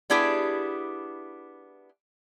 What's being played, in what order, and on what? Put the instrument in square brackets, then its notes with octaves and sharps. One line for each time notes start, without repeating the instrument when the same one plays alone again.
[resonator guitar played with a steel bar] B3 D4 E4 G4 G#4